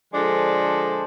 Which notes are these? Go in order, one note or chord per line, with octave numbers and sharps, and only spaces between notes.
D3 F3 G#3 D4 A4 C5